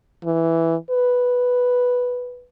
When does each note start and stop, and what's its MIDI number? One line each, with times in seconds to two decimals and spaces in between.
0.24 0.75 52
0.90 2.46 71